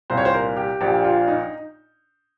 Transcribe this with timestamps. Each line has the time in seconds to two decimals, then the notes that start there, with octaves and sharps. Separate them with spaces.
0.10 C2 A#2 C5
0.17 C#5
0.25 C5
0.34 A#4
0.57 G4
0.81 A#1 A#2 G4
1.04 F4
1.28 D#4